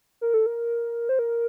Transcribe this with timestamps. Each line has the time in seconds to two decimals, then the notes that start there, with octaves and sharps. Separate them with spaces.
0.21 A#4
0.34 A4
0.46 A#4
1.09 C5
1.19 A#4